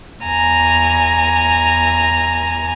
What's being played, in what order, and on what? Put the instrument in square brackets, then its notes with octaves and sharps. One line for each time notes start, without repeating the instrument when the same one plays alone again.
[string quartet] E2 G#5 A#5